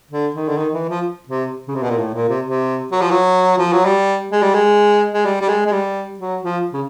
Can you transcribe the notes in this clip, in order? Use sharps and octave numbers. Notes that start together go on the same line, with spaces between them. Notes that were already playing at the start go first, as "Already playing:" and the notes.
D3
D#3
D3
D#3
E3
F3
C3
C#3
C3
B2
A#2
A2
A#2
C3
C3
F#3
F3
F#3
F3
F#3
G3
G#3
G3
G#3
G#3
G3
G3
G#3
G#3
G3
F#3
F3
C#3